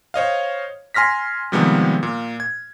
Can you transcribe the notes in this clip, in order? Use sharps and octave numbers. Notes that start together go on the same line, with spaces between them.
C5 C#5 D#5 F5
G#5 C6 F6 A#6 B6
C3 D#3 F3 G3 G#3 B3
A#2
G#6